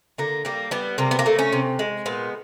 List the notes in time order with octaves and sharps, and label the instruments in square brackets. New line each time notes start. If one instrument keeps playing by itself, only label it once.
[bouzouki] D3 A#3
G3 A#3
G3 B3
C3 A#3
B3
A#3
A3
C#4
C3
G#3
A#2 B3